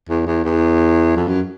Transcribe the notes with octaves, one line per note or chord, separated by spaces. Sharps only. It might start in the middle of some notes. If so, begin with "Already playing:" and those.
E2
E2
E2
F2
F#2